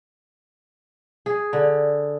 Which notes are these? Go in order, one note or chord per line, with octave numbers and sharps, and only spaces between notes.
G#4
D3